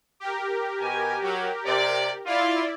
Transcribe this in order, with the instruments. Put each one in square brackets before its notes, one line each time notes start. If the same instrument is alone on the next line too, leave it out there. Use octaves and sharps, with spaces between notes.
[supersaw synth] G4 A#4
[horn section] B2 G#5
F#3
C3 D5
[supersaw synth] E4 D5 [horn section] F4